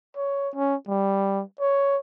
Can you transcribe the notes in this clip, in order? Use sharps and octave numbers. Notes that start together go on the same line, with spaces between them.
C#5
C#4
G3
C#5